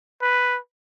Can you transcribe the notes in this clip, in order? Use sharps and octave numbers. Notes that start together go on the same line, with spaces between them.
B4